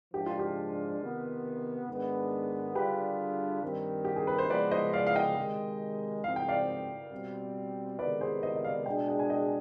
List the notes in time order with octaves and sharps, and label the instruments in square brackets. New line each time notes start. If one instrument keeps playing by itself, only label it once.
[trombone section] G#2 F3 G#3 D4 [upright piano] G4
[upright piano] F4
G4
[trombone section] C3 D#3 B3
G#2 D#3 G#3 B3 D4
[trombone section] D3 G3 D4 F4 G#4 [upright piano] G4 B4
[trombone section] G2 D#3 G3 C4
[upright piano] G4
G#4
B4
C5
[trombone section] F3 G#3 B3 [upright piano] B4 D5
[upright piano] C5 D#5
D5 F5
F5
D#5 G5
[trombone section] C3 D#3 G#3
[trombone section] G#2 F3 C4 [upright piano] F5
[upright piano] G5
D5 F5
[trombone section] B2 G3 C4
[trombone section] C3 D#3 G#3 B3 [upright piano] B4 D5
[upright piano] G#4 C5
C5 D#5
D#5
D5 F5
[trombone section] B2 G#3 D4 G#4 [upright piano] D#5 G5
[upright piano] D#5 G5
G#5
D#5 G5